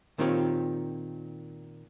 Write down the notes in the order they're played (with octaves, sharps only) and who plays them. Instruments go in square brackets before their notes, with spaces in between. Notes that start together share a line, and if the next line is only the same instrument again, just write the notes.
[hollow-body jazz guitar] A#2 D#3 C4 F4 G4 C#5